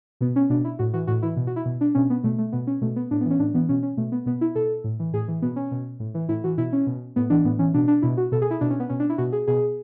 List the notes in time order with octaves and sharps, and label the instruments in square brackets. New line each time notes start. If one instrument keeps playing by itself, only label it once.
[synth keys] B2 B3
C#4
B2 D4
E4
A2 F#4
E3 F#4
A2 F#4
E3 E4
B2
F#4
E4
B2
D4
B2 C#4
B3
B2 A3
A3
B2 B3
C#4
B2 A3
B3
A2 D4
B3
E3 C#4
A2 D4
E3 B3
B2 C#4
C#4
B2 A3
B3
B2 B3
E4
B2 A4
A2
E3
A2 G#4
E3
B2 B3
C#4
B2
A2
E3
A2 E4
E3 F#4
B2 E4
C#4
B2
A2 B3
E3 D4
A2 B3
E3 C#4
B2 D4
D4
B2 E4
F#4
B2 A4
G#4
E4
B2 D4
C#4
B3
B2 C#4
D4
E4
B2 F#4
G#4
B2 G#4